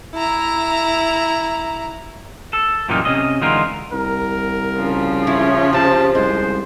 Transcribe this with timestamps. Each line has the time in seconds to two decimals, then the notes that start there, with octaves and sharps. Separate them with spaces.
0.15 E4 A#5
2.53 A4
2.89 F#2 A#2 E3 G3 A#3 D#4
3.05 C3 C#4 D#5
3.41 D3 E3 G#3 D#4 F4 A#4
3.92 C2 A#4
4.76 C#3 F3
5.27 E4 C#5
5.73 C3 A5
6.15 C2 G#3 C5